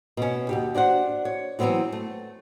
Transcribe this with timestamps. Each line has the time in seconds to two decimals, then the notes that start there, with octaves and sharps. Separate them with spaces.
0.17 B2 C#4
0.49 D#2 F#4 G4
0.75 D4 F#4 C5 F#5
1.25 C#5
1.59 E3 F#3 A3 B3 C4 F#4
1.92 A3